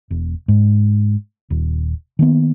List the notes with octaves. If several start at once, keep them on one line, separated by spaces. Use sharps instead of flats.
E1
G#2
D#1
D#3 A#3 B3